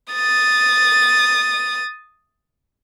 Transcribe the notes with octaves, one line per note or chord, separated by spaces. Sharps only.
D#6 A6